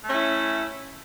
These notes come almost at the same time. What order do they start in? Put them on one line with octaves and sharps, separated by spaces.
A3 C#4 E4